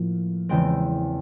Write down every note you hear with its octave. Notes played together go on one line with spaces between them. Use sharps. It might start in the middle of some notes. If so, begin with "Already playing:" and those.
Already playing: A2 F3 A#3
E2 C#3 E3 G#3 C4 G5